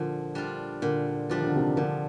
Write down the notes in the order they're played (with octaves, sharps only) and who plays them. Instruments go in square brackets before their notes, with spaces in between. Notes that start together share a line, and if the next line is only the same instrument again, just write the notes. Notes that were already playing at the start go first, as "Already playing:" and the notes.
Already playing: [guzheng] A#2 [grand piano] D3 F3
[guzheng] G3 D4 F4
[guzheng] A#2 [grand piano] D3
[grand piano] F3 [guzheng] G3 D4 F4
[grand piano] D#3
D3
C3 D#3
[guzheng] A#2 [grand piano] D3 F3